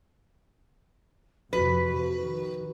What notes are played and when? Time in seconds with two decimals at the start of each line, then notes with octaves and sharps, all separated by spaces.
1.53 F2 C3 F3 F#4 B4
2.19 D#3